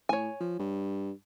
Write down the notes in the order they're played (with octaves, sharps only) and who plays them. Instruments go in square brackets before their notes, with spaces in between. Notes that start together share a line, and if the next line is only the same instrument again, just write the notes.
[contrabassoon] A2 [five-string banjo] C#5 G#5
[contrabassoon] F3
G2